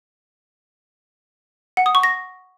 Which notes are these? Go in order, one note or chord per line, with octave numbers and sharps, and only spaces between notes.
F#5
D#6
C#6
A#6